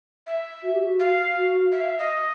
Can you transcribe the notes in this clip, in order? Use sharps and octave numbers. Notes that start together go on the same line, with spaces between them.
E5
F#4
G4
F#4
F5
F#4
E5
F5
E5
D#5